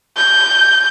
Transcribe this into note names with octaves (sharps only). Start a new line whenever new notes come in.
G6